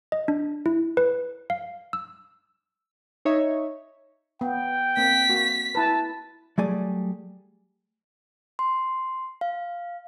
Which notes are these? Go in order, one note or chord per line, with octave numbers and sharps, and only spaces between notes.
D#5
D4
E4
B4
F5
E6
D#4 C#5 E5
B3 G5
A#3 C4 B6
A#3 F#4
E4 B4 A5
F#3 G3 A3 G#4 D5 G#5
C6
F5